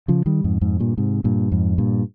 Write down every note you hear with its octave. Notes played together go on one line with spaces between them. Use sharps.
C#3 F3
D#3 G3
F2 G#2
F2 G#2
G2 A#2
G#2 C3
G2 A#2
F2 G#2
G2 A#2